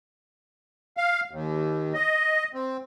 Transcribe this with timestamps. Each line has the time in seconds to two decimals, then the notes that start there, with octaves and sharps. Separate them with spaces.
0.97 F5
1.31 D#2
1.94 D#5
2.54 C4